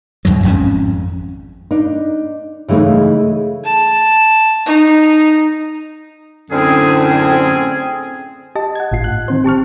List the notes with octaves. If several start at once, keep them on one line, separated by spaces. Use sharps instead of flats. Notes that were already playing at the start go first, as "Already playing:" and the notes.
E2 G2 B2 F#3
G#1 F2 G#2 C#4
D4 D#4
C#3 E3 G#3 A3 D#4
A5
D#4
F#2 A2 D3 C4 C#4 G#4
G4 D#5 A5
F#5 G#6
G#1 A2 F4 C7
F#6
D#3 C4 C5
G4 A5 C#6 F6